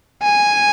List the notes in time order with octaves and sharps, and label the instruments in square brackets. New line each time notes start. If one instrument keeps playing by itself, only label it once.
[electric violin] G#5